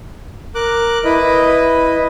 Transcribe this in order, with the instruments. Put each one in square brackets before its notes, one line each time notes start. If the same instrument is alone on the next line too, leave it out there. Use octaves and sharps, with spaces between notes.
[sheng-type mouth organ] A#4 D6 F#6
E4 B4 D#5